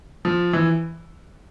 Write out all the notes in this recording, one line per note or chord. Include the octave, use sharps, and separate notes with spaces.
F3
E3